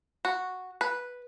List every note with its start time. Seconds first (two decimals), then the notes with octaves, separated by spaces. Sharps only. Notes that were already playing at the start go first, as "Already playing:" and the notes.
0.25 F#4
0.81 B4